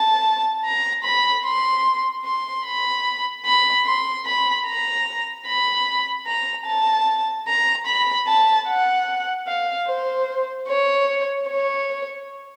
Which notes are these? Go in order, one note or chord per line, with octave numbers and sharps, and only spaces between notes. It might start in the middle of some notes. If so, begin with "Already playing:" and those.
Already playing: A5
A#5
B5
C6
C6
B5
B5
C6
B5
A#5
B5
A#5
A5
A#5
B5
A5
F#5
F5
C5
C#5
C#5